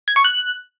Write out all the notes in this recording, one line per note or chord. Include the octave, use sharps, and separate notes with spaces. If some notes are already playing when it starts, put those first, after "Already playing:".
G#6
C#6
F#6